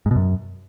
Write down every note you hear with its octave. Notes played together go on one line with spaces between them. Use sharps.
G#2
B2
F#2